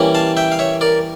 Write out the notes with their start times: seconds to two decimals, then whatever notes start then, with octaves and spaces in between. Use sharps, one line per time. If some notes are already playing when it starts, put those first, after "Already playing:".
Already playing: E3 G3 A#3 C#4
0.15 F5 A5
0.37 E5 G5
0.52 F5
0.59 C#5 E5
0.81 A#4 D5